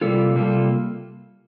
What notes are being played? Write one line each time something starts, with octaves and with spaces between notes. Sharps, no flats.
C3 G3 A#3 F4 A4
C3 G3 A#3 F4 A4